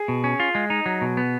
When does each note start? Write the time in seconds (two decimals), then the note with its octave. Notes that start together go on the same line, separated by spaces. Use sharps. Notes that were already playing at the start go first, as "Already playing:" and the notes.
Already playing: G#4
0.08 B2
0.24 C#4
0.40 F4
0.55 G#3
0.70 D#4
0.86 F#3
1.01 B2
1.17 B3